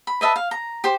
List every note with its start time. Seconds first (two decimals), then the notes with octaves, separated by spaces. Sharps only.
0.07 B5
0.21 B4 D#5 E5 A5
0.36 F5
0.51 A#5
0.84 G4 C5